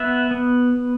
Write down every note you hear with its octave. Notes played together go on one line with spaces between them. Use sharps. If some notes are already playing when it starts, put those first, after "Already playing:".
Already playing: B3 E5 F#5
B3